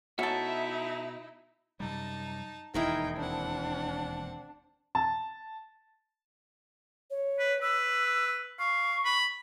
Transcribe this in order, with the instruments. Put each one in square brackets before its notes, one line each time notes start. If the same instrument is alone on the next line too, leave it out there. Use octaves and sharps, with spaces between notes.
[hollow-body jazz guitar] B2 F#4 [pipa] C#4 A4 [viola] D#4 E4 [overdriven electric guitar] E5
[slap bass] F#2 C3 G3 [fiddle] D#4 A5
[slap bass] E1 D#2 [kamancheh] D#4 [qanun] E4 G#4 A#4 [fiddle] G5
[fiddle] C4 F#5 [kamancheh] D4
[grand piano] A5
[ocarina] C#5
[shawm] B4
[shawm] B4 [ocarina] E6
[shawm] F5 [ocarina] C#6
[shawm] B5